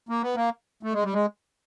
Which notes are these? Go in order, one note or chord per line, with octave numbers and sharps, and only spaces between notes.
A#3
B3
A#3
A3
G#3
G3
G#3